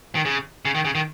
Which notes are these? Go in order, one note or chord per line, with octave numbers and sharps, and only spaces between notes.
D#3
C#3
C#3
D#3
C#3
D#3